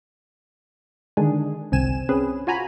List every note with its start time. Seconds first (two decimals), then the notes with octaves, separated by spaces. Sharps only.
1.17 D3 D#3 G#3 D4 G#4
1.72 G1 C2 C4 G#5 E7
2.09 C4 C#4 G#4 B4
2.47 F4 F#4 G#5 A#5 B5